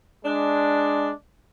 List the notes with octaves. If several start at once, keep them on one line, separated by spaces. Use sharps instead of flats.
G#3 D4